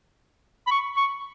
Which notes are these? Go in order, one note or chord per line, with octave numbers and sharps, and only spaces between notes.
B5
C#6
C#6